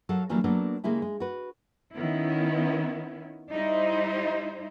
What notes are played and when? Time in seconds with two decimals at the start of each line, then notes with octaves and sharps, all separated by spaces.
0.09 F#3 A4 A#4 F5 F#5
0.29 D3 E3 F#3 G3 A#3
0.44 F#3 A#3 B3 D4 A4
0.84 C#3 G#3 A#3 E4 G4
1.02 G#3
1.20 F#4 B4
1.95 D#3 B3 C#4 E4
3.51 G3 D#4 E4 C5